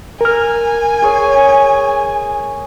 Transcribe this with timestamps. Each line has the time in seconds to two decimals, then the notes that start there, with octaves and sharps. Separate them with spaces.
0.21 A#4 G#5 F6
1.02 G#4 C#5